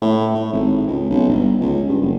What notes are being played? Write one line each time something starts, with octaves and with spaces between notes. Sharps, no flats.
A2
A2
G#1
C#2
B1
G1
C#2
G2
F#1